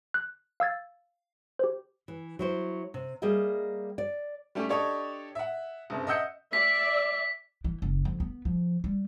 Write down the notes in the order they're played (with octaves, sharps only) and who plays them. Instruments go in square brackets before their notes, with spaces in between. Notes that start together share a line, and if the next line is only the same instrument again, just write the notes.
[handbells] F#6
F5 E6 G#6 A6
G4 C5
[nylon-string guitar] E3
F#3 E4 C5
C3
G3 A#3 G#4 D#5 E5
D5
[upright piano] G3 A3 C#4 G4
D4 G4 A4 C#5 D#5
E5 F#5
F#1 G2 C3
D#5 E5 F#5 E6 G6 C#7
[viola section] D5 E5 [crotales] B6
[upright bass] E3
F#1
F2
B3
F3
G3